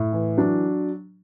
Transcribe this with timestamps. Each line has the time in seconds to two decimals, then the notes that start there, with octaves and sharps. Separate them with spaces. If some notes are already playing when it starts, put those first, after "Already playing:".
Already playing: A2
0.13 E3
0.38 F#3 D4